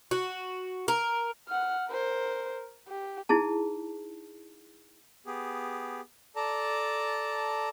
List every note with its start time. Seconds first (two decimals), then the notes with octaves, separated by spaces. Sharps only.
0.11 F#4
0.88 A#4
1.48 F#5 F6
1.89 A#4 C5
2.88 G4
3.29 D#4 E4 G#4 A5
5.26 B3 G4 G#4
6.36 A4 D5 A5 A#5